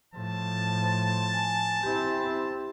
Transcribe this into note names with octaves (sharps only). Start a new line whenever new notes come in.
A2 F3 A5
G#5
C4 E4 G4